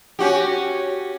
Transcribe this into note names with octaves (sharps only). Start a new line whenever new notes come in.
C#4 F#4 G4